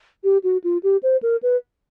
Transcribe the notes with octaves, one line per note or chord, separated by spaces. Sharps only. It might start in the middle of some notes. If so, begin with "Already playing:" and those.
G4
F#4
F4
G4
C5
A#4
B4